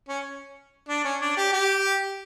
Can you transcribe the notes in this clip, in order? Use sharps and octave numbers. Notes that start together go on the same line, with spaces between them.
C#4
D4
C#4
D4
G4
G4